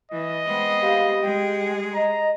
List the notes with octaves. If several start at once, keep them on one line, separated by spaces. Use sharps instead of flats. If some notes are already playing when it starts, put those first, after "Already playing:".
E3 D#5
G#3 B3 C4
G4 F5
G#3 G#4 G5
D#5 A#5